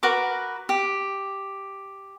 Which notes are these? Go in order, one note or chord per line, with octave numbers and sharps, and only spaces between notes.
F#4 A#4 B4 D6
G4